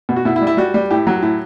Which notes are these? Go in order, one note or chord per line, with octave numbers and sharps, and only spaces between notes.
B2
F#4
B2 E4
E4
G3
E4
G3 F#4
G3
A2 G4
F#3
A2